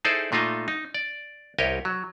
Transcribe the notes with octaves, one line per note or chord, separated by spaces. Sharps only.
D#4 E4 G#4 A4 C5 D5
A#2 A3 D#4 F4 D#5 E5
D#4
D5
C2 G4 A#4 C#5 D#5
F#3